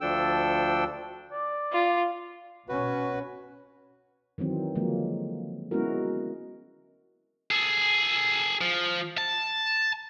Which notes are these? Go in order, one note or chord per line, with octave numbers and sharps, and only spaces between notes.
D2 F3 D4 A4 G5 E6
D5
F4
B2 C#4 F#4 B4
D#3 E3 F#3 C4
D3 F3 F#3 G#3 A#3
G#3 B3 C#4 E4 F#4 A#4
G#4 A4
F3
A5